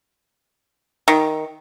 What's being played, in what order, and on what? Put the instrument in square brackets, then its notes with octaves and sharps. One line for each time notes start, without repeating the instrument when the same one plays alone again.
[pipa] D#3